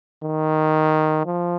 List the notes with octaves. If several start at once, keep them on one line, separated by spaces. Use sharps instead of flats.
D#3
F3